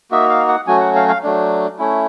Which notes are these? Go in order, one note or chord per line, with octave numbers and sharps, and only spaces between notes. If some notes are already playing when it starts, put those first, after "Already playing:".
A#3 D#4 F#4 E5
F5
F#5
F#3 A3 C#4 F#4 G#5
F#5
F5
F5
F#3 A3 D4
A3 C#4 E4